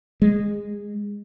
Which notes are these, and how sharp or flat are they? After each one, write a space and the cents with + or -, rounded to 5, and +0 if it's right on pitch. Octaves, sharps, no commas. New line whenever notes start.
G#3 -20